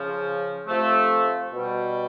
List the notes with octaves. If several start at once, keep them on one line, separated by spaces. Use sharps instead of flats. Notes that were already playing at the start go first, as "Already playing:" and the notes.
Already playing: C#3 F3
C3 F3 A3
B2 G3